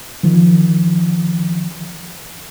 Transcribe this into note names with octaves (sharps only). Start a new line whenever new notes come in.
D#3 F3